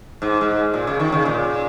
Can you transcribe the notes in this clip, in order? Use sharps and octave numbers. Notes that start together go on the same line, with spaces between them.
G#2
G#2
A#2
C#3
D#3
C#3
A#2